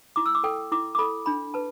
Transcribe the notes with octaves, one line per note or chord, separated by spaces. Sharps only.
E4 D6
E6
D6
A4 G5
E4 D6
D6
A4 B5
D4 B5
B4 A5